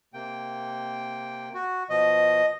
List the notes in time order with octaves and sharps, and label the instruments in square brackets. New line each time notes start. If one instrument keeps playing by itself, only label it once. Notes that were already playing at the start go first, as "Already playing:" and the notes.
[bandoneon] C3 A#3 G5
F#4
[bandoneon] B2 F3 [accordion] D#5